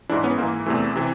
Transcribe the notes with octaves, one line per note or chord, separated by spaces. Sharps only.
G#2 E3 D4 E4
B3 C#4
G#2 E3 A#3
E2 C3 E3 A3
C3 E3